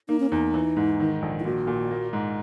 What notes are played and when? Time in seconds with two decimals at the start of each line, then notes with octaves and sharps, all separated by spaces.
0.09 A#3 D#4
0.20 C#4
0.30 E2 D#4
0.54 E3
0.76 G#2
1.00 D#3
1.22 A#1
1.39 E4
1.45 A#2 F#4
1.67 A#2
1.90 A#3
2.13 G#2